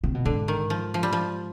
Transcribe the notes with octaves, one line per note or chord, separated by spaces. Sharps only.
C3
B2
G#2 D3
D#3
F3
F3
G3
F3